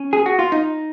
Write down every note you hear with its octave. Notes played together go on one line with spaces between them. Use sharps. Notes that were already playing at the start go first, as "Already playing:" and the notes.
Already playing: C#4
G#4
F#4
F4
D#4